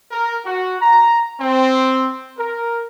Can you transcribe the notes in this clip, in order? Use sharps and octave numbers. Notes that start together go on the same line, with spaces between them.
A#4
F#4
A#5
C4
A#4